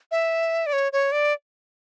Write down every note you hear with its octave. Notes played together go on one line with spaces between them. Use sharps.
E5
D5
C#5
C#5
D5